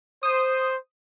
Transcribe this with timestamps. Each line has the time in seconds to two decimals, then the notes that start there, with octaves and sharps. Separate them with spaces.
0.23 C5 D#6